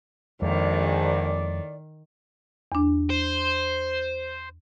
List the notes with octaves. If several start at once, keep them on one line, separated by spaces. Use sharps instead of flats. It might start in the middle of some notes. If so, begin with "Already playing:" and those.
A#1 F2 A2 D#3 G#3 A#3 D5
E2 D4
C5